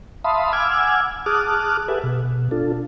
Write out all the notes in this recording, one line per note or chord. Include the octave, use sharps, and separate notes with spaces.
E5 F5 A5 B5 C6 D#6
F#5 G#5 D6 E6 F6 G#6
G#4 A5 D6 D#6 F6 F#6
G4 A4 B4 E5 F#5 G#5
B2
D4 F4 A4